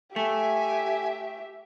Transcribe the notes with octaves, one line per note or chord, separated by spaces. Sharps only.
A3 G4 E5 G#5